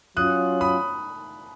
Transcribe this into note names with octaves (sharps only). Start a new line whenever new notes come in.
F#3 C#4 F4 D#6 F#6
B5 D#6